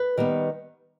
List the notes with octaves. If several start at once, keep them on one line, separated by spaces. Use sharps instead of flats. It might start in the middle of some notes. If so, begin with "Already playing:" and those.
Already playing: B4
D#3 G3 B3